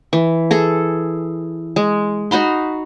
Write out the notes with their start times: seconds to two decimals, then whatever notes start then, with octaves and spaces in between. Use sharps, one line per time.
0.13 E3
0.51 G#4 A4
1.76 G#3
2.31 D#4 F#4 B5 C6